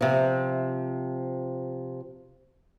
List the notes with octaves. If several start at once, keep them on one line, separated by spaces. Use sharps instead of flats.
C3 F3